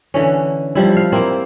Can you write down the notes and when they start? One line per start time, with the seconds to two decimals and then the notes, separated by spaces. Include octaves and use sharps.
0.14 D3 E3 C#4
0.75 F3 G3 E4
0.97 F5
1.12 A#3 C4 E4